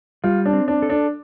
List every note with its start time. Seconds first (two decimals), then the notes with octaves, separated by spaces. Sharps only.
0.24 G3 F4
0.46 D4
0.53 C4
0.68 D4
0.82 A4
0.90 D4